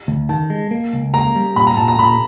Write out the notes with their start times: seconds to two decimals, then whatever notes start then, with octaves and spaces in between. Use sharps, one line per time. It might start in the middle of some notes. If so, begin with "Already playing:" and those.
0.08 D2
0.29 D#3 A5
0.50 G#3
0.71 A#3
0.93 C#2
1.14 A#3 A#5
1.36 G3
1.56 A#2 B5
1.67 A#5
1.77 A#2 A5
1.88 A#5
1.99 A#2 B5